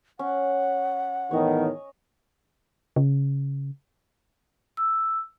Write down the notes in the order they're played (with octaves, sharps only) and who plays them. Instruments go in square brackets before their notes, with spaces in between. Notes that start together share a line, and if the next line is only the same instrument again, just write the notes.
[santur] C#4 [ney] F#5
[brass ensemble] E2 A2 D#3 [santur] C#5 D#5
[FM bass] C#3
[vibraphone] E6